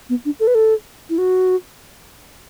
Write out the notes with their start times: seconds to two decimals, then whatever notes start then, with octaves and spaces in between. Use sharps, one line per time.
0.09 B3
0.25 D4
0.40 A4
0.47 B4
0.55 A4
1.10 E4
1.18 F#4